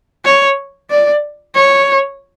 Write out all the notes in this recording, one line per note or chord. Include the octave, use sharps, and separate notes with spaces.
C#5
D5
C#5